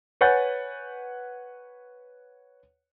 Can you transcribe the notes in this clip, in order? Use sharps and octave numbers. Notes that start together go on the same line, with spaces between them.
B4 C#5 F#5 G#5 G6 A6